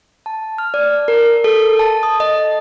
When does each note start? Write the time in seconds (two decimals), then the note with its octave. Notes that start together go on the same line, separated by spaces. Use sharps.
0.26 A5
0.58 F6
0.74 D5
1.08 A#4
1.44 A4
1.79 A5
2.03 D#6
2.20 D#5